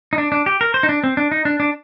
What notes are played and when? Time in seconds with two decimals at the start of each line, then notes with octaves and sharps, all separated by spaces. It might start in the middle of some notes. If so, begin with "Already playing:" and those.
0.13 D#4
0.18 D4
0.32 D4
0.46 G4
0.61 A#4
0.74 C5
0.83 D#4
0.89 D4
1.04 C4
1.17 D4
1.32 D#4
1.45 D4
1.60 D4